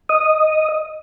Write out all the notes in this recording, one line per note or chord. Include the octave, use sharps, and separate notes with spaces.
D#5 D#6